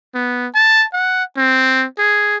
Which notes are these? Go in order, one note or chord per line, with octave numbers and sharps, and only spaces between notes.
B3
A5
F#5
C4
G#4